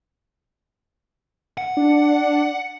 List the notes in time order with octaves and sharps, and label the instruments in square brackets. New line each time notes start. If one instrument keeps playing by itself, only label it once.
[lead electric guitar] F#5
[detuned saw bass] D4